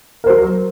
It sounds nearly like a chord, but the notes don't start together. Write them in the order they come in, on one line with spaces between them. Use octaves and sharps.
A#4 C5 F#3